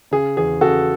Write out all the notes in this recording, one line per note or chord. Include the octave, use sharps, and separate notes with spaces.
C#3 G#4
E2 G#4
C#3 F#4 A4